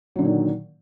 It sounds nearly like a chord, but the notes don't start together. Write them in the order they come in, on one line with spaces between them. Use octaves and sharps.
F#3 D3 A#2 D#3